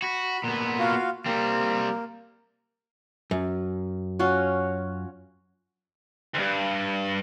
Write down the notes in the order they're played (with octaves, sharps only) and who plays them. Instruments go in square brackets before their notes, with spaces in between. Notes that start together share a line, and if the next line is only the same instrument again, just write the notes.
[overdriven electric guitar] F#4 [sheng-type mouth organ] B5
[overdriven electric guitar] A#2 B3 [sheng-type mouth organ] F#5
[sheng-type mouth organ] F4 F#4 F5
[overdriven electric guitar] G3 C4 [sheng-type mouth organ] A#3
[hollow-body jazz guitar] F#2
[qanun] C#4 F4 F#4
[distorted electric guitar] D2 G2